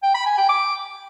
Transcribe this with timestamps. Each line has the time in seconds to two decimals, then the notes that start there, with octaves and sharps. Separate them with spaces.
0.03 G5
0.14 B5
0.26 G#5
0.38 G5
0.49 D6